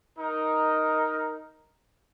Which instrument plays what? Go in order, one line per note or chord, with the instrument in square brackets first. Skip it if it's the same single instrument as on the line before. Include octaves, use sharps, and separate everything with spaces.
[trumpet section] D#4 A#4